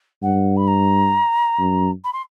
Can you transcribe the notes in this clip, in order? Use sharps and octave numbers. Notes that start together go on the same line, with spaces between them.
G2 F#5
B5
A#5
F#2
B5
C6